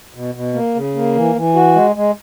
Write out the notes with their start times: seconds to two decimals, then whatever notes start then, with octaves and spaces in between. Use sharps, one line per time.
0.14 B2
0.35 B2
0.54 A#3
0.75 C#3
0.95 A#3
1.15 E3
1.35 E3
1.55 F#4
1.75 G#3
1.96 G#3